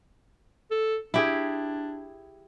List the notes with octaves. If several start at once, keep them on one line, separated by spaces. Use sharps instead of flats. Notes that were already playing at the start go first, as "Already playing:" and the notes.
A4
D4 E4 G4 G#4